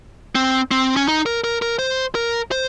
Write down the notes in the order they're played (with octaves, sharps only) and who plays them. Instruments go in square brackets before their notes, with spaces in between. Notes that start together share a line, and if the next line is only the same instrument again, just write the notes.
[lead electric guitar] C4
C4
C#4
D#4
A#4
A#4
A#4
C5
A#4
C5